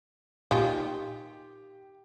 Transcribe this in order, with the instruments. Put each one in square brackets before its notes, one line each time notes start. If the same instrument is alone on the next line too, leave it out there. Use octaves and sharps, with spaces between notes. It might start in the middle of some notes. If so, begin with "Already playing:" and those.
[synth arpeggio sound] A#2 G#5 G6 [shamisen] D#3 F4 [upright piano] G4